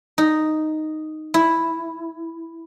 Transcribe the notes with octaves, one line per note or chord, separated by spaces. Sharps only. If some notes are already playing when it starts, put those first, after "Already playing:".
D#4
E4